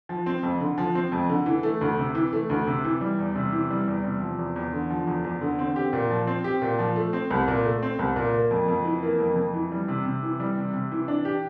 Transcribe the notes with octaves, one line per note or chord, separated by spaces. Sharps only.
F3
C4
F2
D3
F3
C4
F2
D3
E3
A3
D2
C3
E3
A3
D2
C3
E3
G3
E2
C3
E3
G3
E2
C3
F3
E2
E2
D3
F3
E2
E2
D3
C4
G4
A#2
F3
C4
G4
A#2
F3
A3
C4
C2
A#2
A3
C4
C2
A#2
A#3
F2
F2
E3
A#3
F2
F2
E3
G3
C3
C3
E3
G3
C3
C3
E3
D4
G4